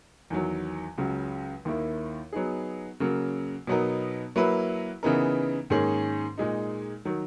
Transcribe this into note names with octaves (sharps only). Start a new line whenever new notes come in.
E2 D#3 F#3
C#2 C#3 F#3
D#2 D#3 A#3 E4
F#3 B3 D#4 G#4
C#3 F#3 A#3
B2 F#3 B3 D#4 A#4
F#3 A#3 E4 B4
C#3 E3 B3 D#4 A#4
G#2 D#3 A#3 C#4 G#4
A#2 G#3 D#4
D#3 F#3